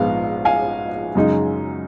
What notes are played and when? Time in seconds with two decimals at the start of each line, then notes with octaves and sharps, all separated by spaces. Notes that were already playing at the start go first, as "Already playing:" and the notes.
Already playing: A#1 G#2 F3 G#3 B3 F5
0.45 F5 G#5
1.15 F#2 C#3 G#3 D#4